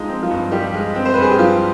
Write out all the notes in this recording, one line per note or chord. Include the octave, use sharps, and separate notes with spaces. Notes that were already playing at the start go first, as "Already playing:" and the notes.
Already playing: F3 G#3 D#4
C4
F3 F4
G2
F3 G3 G4
G#3
C4
C5
B4
G2 G#4
G4
F3 F4